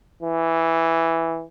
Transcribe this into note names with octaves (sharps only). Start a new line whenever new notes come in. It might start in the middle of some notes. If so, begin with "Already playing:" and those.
E3